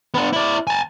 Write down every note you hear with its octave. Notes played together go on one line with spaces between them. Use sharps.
B3 D4
E4 D5
G#5 A5